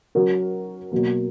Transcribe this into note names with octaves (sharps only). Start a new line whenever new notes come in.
F#3 C#4 F#4 A#4
B2 F#3 A#3